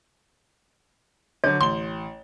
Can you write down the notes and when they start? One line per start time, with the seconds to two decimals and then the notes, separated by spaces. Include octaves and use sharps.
1.44 D3 F#3 C#5
1.61 A1 C6 G7